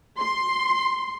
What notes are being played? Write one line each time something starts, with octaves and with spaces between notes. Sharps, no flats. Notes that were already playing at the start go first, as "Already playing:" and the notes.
C6